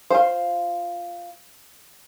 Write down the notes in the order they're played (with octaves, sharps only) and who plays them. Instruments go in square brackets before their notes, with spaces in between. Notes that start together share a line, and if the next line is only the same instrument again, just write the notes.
[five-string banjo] F4 C5